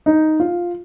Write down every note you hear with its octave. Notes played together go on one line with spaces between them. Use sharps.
D#4
F4